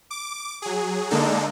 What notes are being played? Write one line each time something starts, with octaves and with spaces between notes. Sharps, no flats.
D6
F#3 G#4
D3 G#3 A#3 D4 D#4 A4